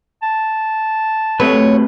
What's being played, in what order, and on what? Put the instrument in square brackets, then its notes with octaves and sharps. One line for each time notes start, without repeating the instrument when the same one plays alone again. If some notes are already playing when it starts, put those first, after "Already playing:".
[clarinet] A5
[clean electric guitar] C3 B4 [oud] F#3 A3 [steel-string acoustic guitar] C#5